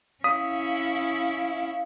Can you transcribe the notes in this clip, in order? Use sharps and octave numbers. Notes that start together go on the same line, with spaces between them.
C#4 E4 F5 D#6 B6